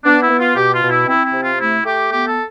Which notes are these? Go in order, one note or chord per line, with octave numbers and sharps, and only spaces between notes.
B3 D4
E4
B3
F4
B2 G4
F4
B2
E4
C4 E4
E4
C3
F4
A3 E4
A3 G4
B3 G4
A4